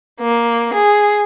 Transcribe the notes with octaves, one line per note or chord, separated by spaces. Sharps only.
A#3
G#4